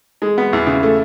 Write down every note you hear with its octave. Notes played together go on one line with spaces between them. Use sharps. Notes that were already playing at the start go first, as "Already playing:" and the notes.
G#3
B3
E2
C#3
A3